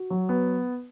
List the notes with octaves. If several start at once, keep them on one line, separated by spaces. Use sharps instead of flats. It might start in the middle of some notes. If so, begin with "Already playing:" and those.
Already playing: F#4
F#3
B3